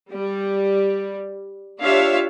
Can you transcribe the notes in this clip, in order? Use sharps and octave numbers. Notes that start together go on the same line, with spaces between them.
G3
D4 F4 G4 C#5 E5 F5